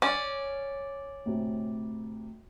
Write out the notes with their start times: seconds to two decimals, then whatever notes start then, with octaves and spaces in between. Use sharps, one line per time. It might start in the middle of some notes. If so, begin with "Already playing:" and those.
0.02 C#4 D5
1.25 D2 A2 C3